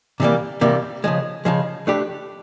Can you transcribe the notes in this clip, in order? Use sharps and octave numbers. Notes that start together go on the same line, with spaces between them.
C3 E3 G3 A#3
C3 E3 G3 A#3
C#3 F3 G#3
C#3 F3 G#3
A3 D4 G4 B4